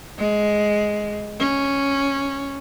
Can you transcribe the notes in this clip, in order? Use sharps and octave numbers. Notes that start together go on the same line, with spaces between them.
G#3
C#4